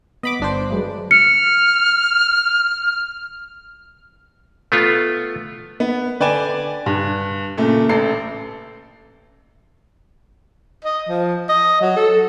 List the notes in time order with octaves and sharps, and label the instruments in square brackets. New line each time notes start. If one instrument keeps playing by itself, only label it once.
[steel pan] B3 [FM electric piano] D#5 B5 D6
[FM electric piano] G1 D4 C5
[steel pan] F#3 G#3 B4
[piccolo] F6 [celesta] C#7
[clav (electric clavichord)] A3 B3 F4
[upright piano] B3
D3 B4 D5 G5 G#5 E7
G2
A#2 C#3 A3
A1 A4 C7
[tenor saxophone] D#5
F3
D#5
F#3
A4